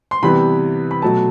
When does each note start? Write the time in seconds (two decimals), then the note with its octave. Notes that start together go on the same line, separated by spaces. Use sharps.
0.11 C6
0.23 C3 E3 G3 B3 B5
0.91 B5
1.02 B2 F#3 A3 A5